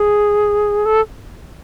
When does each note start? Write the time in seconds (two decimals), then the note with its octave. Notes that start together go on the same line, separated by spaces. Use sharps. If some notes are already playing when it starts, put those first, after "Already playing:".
Already playing: G#4
0.86 A4